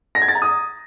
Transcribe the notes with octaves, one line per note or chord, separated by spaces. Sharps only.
A#6
G#6
A6
A#5
D#6